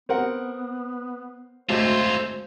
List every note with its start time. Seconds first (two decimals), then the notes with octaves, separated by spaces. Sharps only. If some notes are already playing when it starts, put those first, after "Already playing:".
0.09 B3 C4 A#4 F#5
1.69 G#1 D2 A3 F4 C5